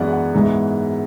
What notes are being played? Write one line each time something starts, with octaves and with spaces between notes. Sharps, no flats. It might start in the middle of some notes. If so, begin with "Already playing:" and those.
Already playing: F#2 E3 G#3 B3 D4 D5 F#5
F#5
G#2 E3 G#3 B3